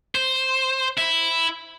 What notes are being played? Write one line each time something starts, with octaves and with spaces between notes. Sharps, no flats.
C5
E4